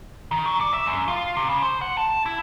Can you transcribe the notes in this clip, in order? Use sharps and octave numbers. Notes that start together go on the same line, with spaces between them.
D#3
F#3
D5
E5
F#2
F4
C3
C#3
C5
F#5
A5
E4